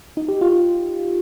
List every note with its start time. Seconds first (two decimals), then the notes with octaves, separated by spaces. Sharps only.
0.17 D#4
0.28 G4
0.41 F4